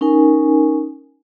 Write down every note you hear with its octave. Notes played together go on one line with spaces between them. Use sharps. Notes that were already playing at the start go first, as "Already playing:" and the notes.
C#4 D#4 A#4 G#5